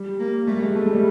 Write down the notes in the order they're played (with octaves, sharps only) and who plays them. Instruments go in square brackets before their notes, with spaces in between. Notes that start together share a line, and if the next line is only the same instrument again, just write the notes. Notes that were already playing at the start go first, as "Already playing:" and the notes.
Already playing: [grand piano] G3
[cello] A#3
[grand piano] G3 [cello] A3
[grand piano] G#3
[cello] G3 [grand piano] A3
[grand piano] G#3
G3